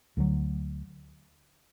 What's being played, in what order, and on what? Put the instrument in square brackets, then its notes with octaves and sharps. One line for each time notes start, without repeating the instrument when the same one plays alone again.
[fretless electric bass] D2 D3 F#3